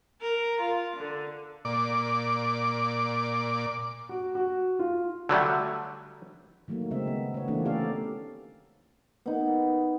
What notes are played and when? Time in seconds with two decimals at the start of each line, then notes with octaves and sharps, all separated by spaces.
0.21 A#4
0.60 F4
0.97 D3
1.65 A#2 D5 D6
4.09 F#4
4.35 F#4
4.79 F4
5.29 D3 F#3 G3 A3
6.68 D#3 F#3 A3 A#3
6.91 C#3 G#3 C4 E5
7.07 B3
7.34 B3 C#5
7.48 D#3 E3 A3 A#3 C4 D4
7.65 C#4 G4 A4 D5 F5
9.26 B3 D#4